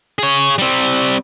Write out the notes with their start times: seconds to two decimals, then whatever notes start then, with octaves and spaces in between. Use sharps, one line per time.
0.19 G#4 C#5
0.59 G3 C4